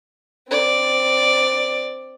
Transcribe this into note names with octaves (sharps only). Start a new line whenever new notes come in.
C4 D5